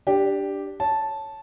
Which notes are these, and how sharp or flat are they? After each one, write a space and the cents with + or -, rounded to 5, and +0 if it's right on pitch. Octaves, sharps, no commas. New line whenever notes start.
D4 +0 G4 +0
C#5 +0 A5 -5